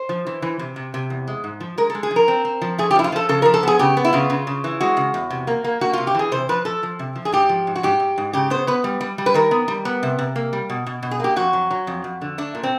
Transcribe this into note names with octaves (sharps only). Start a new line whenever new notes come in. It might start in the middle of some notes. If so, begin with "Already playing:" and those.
Already playing: C5
F3
E3
E3
C3
C3
C3
E2
G#3
G#2
F3
G#3 A#4
A4
G#3
G#4
F3
A#4
C4
C4
F3
A3 G#4
G4
F3 E4
F4
F3 A4
C#3 A4
F3 A#4
A4
B3 G#4
C#3 G4
B3
E4
C#3 F4
C#3
C#3
E3
G#3 F#4
C#3
E2
C3
A#3
A#3
A#3 F#4
C3 F4
G4
E3 G#4
C3 C5
F3 B4
F3 A4
F3
C3
F3
G#4
G#2 G4
F3
G#2
F#4
G#2 G4
G#2
G#2
C#3 G4
B3 C5
B3 B4
G3
G3
G3
B4
D#3 A#4
B3
G3
B3
C3
C3
A#3
G3
B2
B2
B2
G#4
A#3 G4
F2 F#4
F#3
F#3
F2
F2
D3
A3 D4
A#2
C4